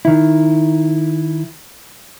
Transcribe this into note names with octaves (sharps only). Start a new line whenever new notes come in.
D#3 E4